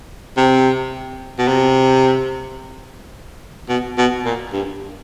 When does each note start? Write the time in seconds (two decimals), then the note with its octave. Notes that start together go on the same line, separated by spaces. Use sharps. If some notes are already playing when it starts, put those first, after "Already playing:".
0.37 C3
1.39 B2
1.48 C3
3.69 B2
3.98 B2
4.25 A#2
4.53 G2